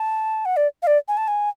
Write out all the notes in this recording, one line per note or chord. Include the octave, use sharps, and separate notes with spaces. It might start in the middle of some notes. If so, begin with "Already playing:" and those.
Already playing: A5
F#5
D5
F5
D5
G#5
A5
G#5